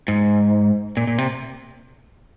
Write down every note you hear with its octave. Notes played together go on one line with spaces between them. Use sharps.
G#2
A#2
A#2
C3